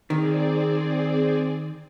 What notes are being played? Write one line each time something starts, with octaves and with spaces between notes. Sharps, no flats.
D#3 C4 G#4 D5